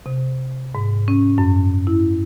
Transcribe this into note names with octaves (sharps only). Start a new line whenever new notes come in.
C3
G#2
C#4
F#2
E4